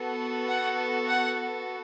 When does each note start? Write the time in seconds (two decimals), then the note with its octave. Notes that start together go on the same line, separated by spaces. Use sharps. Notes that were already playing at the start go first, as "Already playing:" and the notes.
Already playing: B3 F#4 A4
0.48 F#5
1.08 F#5